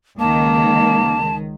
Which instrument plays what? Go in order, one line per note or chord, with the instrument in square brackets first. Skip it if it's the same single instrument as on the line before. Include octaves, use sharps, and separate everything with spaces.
[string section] C#2 D#3 [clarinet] A#3 [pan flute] A5